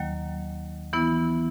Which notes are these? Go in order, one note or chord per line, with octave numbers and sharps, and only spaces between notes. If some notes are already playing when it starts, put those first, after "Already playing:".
Already playing: D#2 D#3 F#3 A#3
E3 B3 E4